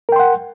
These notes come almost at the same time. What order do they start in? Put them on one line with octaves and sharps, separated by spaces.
A#4 G5 C6 F#5